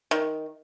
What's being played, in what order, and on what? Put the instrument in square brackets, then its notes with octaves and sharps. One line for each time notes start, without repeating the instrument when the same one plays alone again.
[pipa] D#3